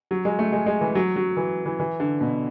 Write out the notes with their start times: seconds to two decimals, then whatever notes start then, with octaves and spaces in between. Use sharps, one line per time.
0.11 F#3
0.25 G#3
0.39 A3
0.52 G#3
0.66 G#3
0.81 E3
0.95 F#3
1.16 F#3
1.37 E3
1.66 E3
1.80 E3
2.00 D3
2.21 B2